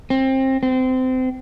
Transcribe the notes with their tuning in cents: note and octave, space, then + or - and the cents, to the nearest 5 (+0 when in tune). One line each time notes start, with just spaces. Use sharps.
C4 +25
C4 -25